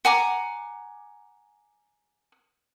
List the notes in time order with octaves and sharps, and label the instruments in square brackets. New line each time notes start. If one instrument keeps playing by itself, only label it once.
[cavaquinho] F#5 G#5 A#5 D6